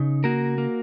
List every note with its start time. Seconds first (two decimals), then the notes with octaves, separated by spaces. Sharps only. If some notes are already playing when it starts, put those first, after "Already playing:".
Already playing: C#3 D#4
0.24 A#3 F#4 A#4
0.58 A#3